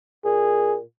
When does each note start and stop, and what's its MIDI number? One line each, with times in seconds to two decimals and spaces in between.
0.25 0.81 46
0.25 0.77 68